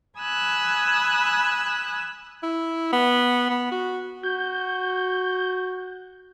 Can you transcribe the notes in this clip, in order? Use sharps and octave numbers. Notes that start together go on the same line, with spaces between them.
G#5 B5 D#6 E6 F#6
E4
B3
B3
F#4
F#4 G6